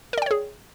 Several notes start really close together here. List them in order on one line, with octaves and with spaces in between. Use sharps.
A#4 D5 G5 C#5 G#4